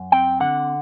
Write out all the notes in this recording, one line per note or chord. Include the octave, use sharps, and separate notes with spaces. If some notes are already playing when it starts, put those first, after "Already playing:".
Already playing: F#2
C4 G5
D3 F#5